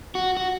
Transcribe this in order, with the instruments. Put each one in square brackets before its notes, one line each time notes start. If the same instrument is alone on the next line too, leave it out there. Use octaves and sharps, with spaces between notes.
[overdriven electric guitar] F#4
F#4